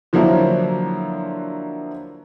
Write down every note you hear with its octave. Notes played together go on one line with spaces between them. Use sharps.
D3 F3 F#3 A#3 D4 E4